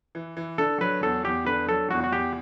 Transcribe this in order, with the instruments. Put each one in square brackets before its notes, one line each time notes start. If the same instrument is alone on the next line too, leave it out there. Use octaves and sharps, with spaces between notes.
[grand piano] E3
E3
[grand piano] D3 [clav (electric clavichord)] A4
[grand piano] F#3 [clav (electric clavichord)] B4
[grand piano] E2 [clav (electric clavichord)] A4
[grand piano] E2 [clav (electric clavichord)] G4
[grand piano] D3 [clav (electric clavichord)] B4
[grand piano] F#3 [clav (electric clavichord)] A4
[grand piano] E2 [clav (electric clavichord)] F#4
[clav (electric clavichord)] F#4
[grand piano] E2 [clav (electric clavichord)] G4